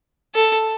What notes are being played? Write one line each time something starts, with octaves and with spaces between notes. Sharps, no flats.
A4